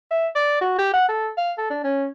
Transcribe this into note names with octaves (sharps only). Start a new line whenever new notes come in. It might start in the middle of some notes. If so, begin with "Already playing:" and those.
E5
D5
F#4
G4
F#5
A4
F5
A4
D4
C#4